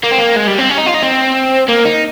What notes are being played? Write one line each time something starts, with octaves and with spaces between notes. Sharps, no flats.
A#3
C4
A#3
G#3
G3
C4
C#4
D#4
F4
D#4
C4
A#3
D#4